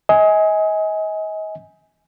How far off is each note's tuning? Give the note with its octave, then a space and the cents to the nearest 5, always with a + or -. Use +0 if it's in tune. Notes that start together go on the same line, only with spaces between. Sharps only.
D#5 +35 G#5 +0